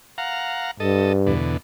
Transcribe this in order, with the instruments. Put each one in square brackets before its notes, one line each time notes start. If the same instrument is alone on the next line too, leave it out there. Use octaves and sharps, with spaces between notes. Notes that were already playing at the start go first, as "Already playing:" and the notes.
[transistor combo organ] F5 F#5 A#5
[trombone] G2 [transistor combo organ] A4 D#5
[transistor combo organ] E2 B2 D3